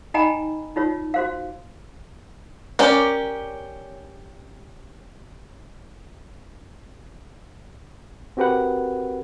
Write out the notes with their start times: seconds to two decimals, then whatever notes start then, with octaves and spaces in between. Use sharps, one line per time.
0.14 D#4 D#5 G5 G#5 A#5 B5
0.76 D#4 F4 C#5
1.14 F#4 C5 F5
2.79 C#4 G4 A#4 D5
8.37 C4 F#4 G4 A#4 B4 F#5